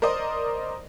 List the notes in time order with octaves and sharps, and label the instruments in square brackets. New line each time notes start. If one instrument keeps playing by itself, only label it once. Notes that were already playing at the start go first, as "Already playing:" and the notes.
[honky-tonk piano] A#4 C5 D5 D#5